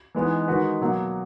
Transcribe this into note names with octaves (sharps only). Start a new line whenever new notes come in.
E3 G#3 B3 D#4
D#3 G#3 D#4 F#4 B4
B2 F#3 A#3